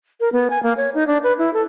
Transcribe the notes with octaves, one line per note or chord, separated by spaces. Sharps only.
A#4
B3
G#5
A#3
C#5
D#4
D4
B4
E4
A4